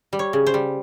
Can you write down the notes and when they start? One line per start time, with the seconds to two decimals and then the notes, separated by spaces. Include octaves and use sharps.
0.13 G3
0.19 C#5
0.33 C#3
0.47 C5
0.54 G3